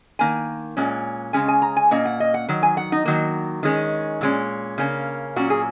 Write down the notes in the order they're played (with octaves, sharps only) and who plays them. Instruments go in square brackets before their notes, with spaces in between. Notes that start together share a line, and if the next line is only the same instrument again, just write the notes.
[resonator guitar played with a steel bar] D#3 A#3 G#5
A#2 G#3 C#4
C#3 G#3 C#4 G#5
G#5
A#5
G#5
A#2 A#3 C#4 D#5
F#5
D#5
F#5
D#3 F#3
G#5
F#5
D#4
D#3 F#3 A#3
D#3 G#3 C#4
A#2 G#3 C#4
C#3 A#3 C#4
A#2 F#3 C#4 F#4
G#4